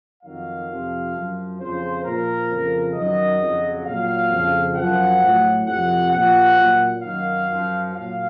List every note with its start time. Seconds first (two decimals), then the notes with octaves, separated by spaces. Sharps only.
0.23 F2 D#3 F#3 F5
0.68 F2 C3 F3
1.14 F#2 F3
1.58 F2 C#3 F3 C5
2.04 A#2 F3 A#4
2.49 F2 C#3 F3
2.94 F#2 D#3 F#3 D#5
3.39 F2 C#3 F#3
3.85 A#2 F#3 F5
4.30 F2 C#3 F3
4.76 F#2 F3 F#5
5.21 A2 F#3
5.66 F2 C3 F3 F#5
6.11 A#2 F3 F#5
6.57 A#2 F#3
7.02 F#2 D#3 F#3 F5
7.47 F#2 F3
7.93 A#2 F#3 F5